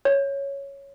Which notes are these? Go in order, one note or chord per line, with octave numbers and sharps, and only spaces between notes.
C#5